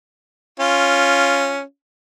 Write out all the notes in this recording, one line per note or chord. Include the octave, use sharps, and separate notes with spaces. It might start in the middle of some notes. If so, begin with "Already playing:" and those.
C#4 F4